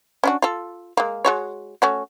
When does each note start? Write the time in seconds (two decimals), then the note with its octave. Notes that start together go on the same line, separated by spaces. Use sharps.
0.24 C#4 D4 F#4
0.42 F4 A4
0.97 G#3 A#3
1.25 G#3 F#4 C#5
1.82 A3 C#4 F#4